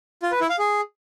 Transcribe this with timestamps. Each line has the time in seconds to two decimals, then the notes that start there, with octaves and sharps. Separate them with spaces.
0.23 F4
0.32 B4
0.41 E4
0.50 F5
0.59 G#4